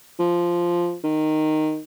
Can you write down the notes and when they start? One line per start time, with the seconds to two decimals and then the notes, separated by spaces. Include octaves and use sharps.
0.20 F3
1.04 D#3